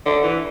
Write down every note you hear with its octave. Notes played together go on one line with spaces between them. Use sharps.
D3
E3